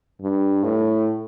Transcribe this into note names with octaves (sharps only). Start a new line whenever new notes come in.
G2
A2